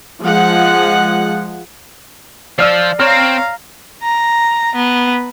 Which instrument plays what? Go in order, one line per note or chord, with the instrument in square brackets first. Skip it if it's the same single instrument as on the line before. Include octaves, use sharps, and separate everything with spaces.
[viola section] F3 G#3 F#5
[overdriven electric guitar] F3 [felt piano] D5 [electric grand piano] E6 F6 C7
[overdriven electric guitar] C4 [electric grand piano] C#5 F6 [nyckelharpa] F5 A#5
[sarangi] A#5
B3